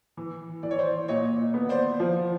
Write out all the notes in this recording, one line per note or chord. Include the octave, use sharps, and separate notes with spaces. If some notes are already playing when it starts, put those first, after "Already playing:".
E3
E3 D5
C#5
C5 D5
A#2 C#5 D#5
B3
C5 D5
F3